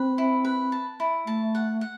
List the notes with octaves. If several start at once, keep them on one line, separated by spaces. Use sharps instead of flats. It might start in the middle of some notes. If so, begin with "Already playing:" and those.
Already playing: C4 B4
E4
B4
A5
E4
A3 A5
F#5
F#5